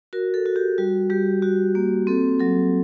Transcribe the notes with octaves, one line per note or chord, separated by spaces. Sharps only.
F#4 A#4
A4
F#4
G4
G3 F#4
G3 G4
F#4 G4
A#3
C4 A4
F#3 A4